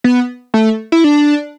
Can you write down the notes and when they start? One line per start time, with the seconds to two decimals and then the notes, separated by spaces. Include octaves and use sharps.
0.04 B3
0.54 A3
0.92 E4
1.04 D4